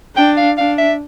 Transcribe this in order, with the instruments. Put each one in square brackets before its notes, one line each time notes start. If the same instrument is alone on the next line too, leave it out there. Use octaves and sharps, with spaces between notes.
[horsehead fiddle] D4 [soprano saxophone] G5
[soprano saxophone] F5
[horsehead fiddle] D4 [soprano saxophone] F5
[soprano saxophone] E5